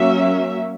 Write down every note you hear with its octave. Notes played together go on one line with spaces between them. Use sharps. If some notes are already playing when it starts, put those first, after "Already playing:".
Already playing: F#3 A#3 C#4 E5